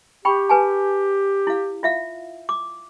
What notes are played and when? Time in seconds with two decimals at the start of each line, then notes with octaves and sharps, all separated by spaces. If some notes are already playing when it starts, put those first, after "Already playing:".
0.25 G4 G5 B5 C#6
0.49 B4 G#5 A5
1.47 E4 F5
1.83 F4 E5 F5
2.49 D6